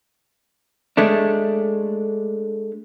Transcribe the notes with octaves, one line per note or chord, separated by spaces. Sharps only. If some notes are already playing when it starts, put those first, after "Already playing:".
G#3 A3 D4